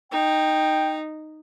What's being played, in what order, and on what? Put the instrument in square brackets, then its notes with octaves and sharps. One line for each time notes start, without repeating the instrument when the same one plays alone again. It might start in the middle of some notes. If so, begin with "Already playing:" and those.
[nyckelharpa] D#4 [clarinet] G5